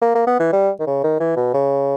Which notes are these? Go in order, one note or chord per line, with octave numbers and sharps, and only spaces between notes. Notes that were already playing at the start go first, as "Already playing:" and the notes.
A#3
A#3
B3
E3
G3
D#3
C#3
D#3
E3
B2
C#3